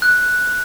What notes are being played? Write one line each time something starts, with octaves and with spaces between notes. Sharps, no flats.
F#6